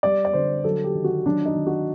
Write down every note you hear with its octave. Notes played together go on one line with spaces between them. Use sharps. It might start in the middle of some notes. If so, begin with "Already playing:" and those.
G3 D5
D5
D3 C5
F#3 A4
G4
D#3
F#4
F#3 D4
D#4
D#3
F#4